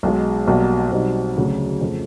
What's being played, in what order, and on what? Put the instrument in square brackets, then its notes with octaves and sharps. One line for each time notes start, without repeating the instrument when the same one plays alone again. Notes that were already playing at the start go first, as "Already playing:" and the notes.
[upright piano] B1 B2 G#3
B1 B2 G3 A#3
B1 B2 G3 C4 D#4
D2 C#3 F#3
F2 C#3 F3 A3